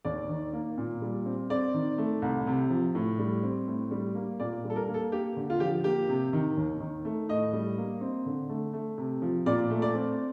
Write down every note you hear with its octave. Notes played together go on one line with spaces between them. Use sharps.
D#2 D5
D#3
A#3
A#2
G3
C4
C4 D5
D#3
A3
C2
C3
F3
A2
G3
C4
A2
G3
A#3
A#2 D5
G3
A4
A#4
A#3
A4
A#3 G4
D3
F4
F3 G4
A#3 G4
C3
D#3
D#2
D#3
A3
A2 D#5
G3
A#3
C4
D3
A3
A3
C3
F3
A#2 D5
A3
D5
C4